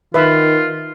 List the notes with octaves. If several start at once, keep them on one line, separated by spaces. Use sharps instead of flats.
D#3 F4 B4 E5